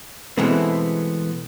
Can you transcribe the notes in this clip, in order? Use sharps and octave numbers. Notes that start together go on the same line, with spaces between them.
B2 E3 G#3 A3 B3 C4